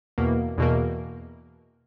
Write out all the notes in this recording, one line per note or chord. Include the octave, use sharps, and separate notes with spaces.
E2 B2 A#3
E2 B2 A#3